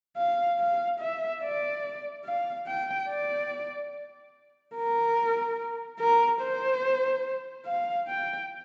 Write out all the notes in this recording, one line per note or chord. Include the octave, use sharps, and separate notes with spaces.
F5
F5
E5
D5
F5
G5
D5
A#4
A#4
C5
F5
G5